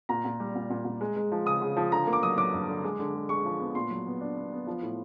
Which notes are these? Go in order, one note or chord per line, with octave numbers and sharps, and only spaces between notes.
A#2 A#5
A#2
G3
A#2
A#2
A#2
G#3
G#3
F3
C#3 D#6
C#3
F3
D3 A#5
A#3
D6
F#3 D#6
F#3 D6
G2
D3
G#3
D3
G#3
G#3 C#6
F3
B3
A#2 C6
F#3
B3
D4
B3
B3
F3
A2